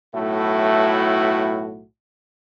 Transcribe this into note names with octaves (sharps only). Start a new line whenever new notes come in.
B1 A2 A3 E4 F#4